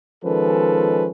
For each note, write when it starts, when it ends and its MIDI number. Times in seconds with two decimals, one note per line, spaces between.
0.24 1.09 51
0.24 1.09 53
0.24 1.09 56
0.24 1.09 61
0.24 1.09 69
0.24 1.09 71